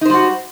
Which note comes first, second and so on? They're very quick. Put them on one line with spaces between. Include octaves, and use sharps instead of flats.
D#4 C5 G3 F#4